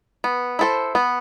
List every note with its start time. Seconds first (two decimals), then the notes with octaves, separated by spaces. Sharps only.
0.24 B3
0.59 E4 A4 C5
0.95 B3